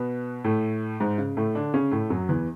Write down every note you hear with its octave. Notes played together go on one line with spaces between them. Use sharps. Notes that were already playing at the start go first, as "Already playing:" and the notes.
Already playing: B2 B3
A2 A3
G#2 G#3
C#3
A2 A3
D3 D4
C#3 C#4
A2 A3
F#2 F#3
E2 E3